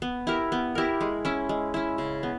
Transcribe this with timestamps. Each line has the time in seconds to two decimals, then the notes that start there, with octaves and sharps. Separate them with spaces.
0.02 B3
0.27 E4 G4 A#4
0.52 B3
0.75 E4 G4 A#4
1.01 G#3
1.25 C#4 E4
1.49 G#3
1.74 C#4 E4
1.98 C#3
2.23 B3